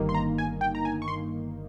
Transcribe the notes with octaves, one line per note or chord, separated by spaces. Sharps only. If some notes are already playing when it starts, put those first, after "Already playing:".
Already playing: G1 G2 D#3 A#3 D#4
C6
A#5
G#5
G5
A#5
G#5
C#6
C6